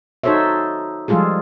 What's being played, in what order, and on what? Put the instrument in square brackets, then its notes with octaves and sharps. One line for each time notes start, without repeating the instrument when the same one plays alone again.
[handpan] D#4 F#4 A4 C5 C#5 E5
F3 G3 G#3 F4 G#4 A4